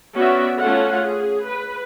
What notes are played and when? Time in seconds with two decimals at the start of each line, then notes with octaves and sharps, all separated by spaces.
0.16 B3 C#4 F#4 D5 E5
0.59 A3 C#4 F4 A4 F#5
1.00 G#4
1.46 B4